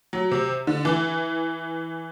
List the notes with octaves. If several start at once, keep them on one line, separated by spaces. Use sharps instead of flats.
F#3
C3
D3
E3